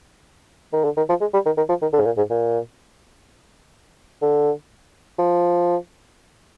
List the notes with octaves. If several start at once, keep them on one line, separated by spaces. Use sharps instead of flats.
D#3
D3
D#3
F3
G#3
G3
D#3
D#3
F3
D#3
D3
G#2
A#2
G#2
A#2
D3
F3